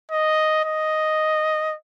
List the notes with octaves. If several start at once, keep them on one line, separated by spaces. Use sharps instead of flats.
D#5
D#5